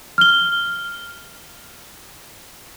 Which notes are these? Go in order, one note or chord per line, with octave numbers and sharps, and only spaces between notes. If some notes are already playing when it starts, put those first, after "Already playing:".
F6 G7